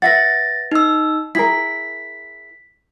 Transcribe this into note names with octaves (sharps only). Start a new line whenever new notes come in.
B4 E5 F#5 A6 A#6
D#4 E6
E4 G#4 A#4 B6